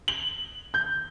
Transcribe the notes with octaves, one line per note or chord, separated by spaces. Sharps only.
F#7
G6